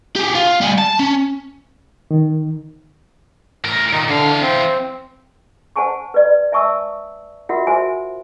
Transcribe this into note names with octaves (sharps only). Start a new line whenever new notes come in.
G4 G#4
F4
G3 G#4
A5
C#4
D#3
A2 A#4
A#2 D#3 D#4
D3 E3 F5
C4
C5 F#5 G#5 A5 C#6
B4 D5
E5 G#5 A5 C#6 D#6 E6
F4 F#4 A#4 E5 F#5
F#4 C5 E5 G#5